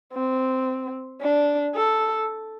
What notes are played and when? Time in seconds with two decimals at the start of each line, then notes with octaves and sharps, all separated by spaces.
0.14 C4
1.22 D4
1.76 A4